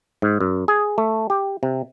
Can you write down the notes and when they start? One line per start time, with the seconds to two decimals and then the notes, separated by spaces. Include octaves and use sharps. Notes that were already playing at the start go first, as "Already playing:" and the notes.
0.22 G#2
0.40 F#2
0.68 G#4
0.98 A3
1.30 G4
1.63 C3